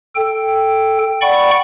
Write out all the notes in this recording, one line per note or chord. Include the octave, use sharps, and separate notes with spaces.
A4 G5
D5 F#5 G5 B5 C#6